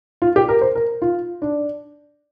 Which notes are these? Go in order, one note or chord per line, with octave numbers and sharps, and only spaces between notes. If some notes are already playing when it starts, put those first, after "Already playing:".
F4
G4
A#4
C5
A#4
F4
D4